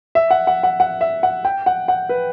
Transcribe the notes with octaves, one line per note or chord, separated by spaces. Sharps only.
E5
F#5
F#5
F#5
F#5
E5
F#5
G5
F#5
F#5
B4